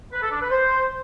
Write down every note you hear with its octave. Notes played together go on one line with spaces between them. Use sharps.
B4
A4
D4
B4
C5